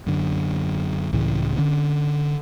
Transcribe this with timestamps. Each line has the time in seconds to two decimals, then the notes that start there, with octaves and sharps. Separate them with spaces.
0.07 F#2 D3
1.12 C#2 A2 C#3 E3
1.56 D3 C#4 D4